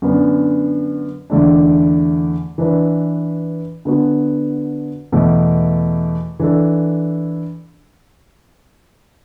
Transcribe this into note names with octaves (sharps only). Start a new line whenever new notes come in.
F#2 D3 B3 D4
E2 D3 A3 D4
E3 D4 B4
D3 B3 F#4
E2 B2 A3
E3 D4 A4